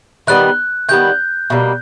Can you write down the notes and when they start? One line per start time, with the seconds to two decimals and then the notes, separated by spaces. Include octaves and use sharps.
0.27 D#3 G3 B3 F#6
0.89 D#3 G3 B3 G6
1.50 B2 G3 A#3